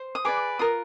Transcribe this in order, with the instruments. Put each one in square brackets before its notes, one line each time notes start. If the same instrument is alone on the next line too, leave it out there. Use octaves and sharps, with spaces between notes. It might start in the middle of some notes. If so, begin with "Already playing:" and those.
Already playing: [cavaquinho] C5
D#6
G#4 B4 D5 D6
F4 A#4 D#6